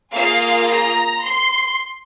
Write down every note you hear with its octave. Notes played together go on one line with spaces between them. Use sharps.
A#3 F4 G#4 F5
A#5
C6